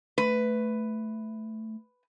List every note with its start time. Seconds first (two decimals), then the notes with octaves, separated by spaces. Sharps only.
0.18 A3 B4